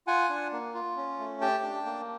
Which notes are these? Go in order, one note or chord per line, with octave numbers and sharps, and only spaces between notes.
F4 F#5 G#5
D4
A#3
F4
C#4
A3
G4 G5 A5
D4
A#3